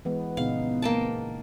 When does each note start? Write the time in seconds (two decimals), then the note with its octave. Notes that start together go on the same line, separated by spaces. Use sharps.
0.05 E3 G#3 B3
0.37 A#2 C#3 B3 D#4 F5
0.82 A#3 G5 A5